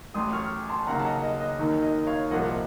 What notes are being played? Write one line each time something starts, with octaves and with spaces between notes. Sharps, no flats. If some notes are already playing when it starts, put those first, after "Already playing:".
A1 A2 F#3 C6 D#6
C#6 F6
A5 C6
D#2 C#3 F#3 F#5 A#5
A5
D#5 F#5
D#5
D#5
D#2 D#3 F#3
D#5
C#5 F5
C2 A#2 F3 D#5 F#5